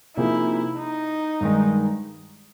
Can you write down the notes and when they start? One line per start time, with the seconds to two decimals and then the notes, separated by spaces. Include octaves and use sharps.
0.17 C3 F3 A#3 D#4 E4 G#4
0.79 D#4
1.41 G2 D#3 G#3